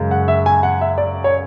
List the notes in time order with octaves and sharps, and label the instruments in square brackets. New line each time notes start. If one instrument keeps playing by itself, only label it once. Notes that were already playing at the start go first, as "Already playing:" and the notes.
Already playing: [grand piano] F#2 C#3 G#3
F#5
E5
G#5
F#5
E5
D5
C#5